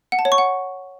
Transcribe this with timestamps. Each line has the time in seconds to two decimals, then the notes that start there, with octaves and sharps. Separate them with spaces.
0.12 F#5
0.19 A5
0.25 C#5
0.32 C#6
0.38 F#5